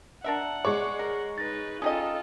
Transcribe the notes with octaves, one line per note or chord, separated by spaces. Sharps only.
D4 A#4 E5 F#5
G#3 C#5 D5 D6
A#4
D#4 B4 A6 A#6
C#4 D#4 F4 A4 D#5 G5 D#6